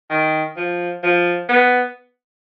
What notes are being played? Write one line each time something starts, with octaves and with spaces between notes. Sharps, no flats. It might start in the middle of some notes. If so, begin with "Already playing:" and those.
D#3
F3
F3
B3